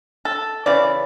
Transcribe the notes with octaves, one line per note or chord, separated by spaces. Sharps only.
A4
C#3 E3 D5